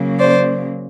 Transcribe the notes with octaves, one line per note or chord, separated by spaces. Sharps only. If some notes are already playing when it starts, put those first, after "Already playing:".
Already playing: C#3 F#3 A#3
C5 D5